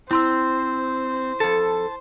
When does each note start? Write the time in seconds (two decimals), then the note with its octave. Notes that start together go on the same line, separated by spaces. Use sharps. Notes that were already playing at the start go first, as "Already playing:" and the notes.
0.11 C4 E4 C5 C6 E6
1.40 F2 A4 A5